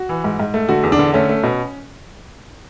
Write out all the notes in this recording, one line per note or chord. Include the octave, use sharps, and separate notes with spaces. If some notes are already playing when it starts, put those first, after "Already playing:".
Already playing: F#4
E3
G#2
G#2
A3
D3 F#4
E2
D4
D3
A3 C#4
A3
B2